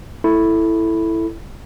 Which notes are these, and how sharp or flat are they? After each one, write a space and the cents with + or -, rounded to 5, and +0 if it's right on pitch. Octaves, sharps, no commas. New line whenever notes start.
E4 +0 A4 +0 B5 +0